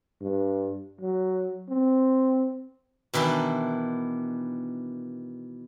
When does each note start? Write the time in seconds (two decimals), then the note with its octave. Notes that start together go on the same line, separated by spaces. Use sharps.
0.21 G2
1.01 F#3
1.69 C4
3.14 B2 D#3 E3 D4 E4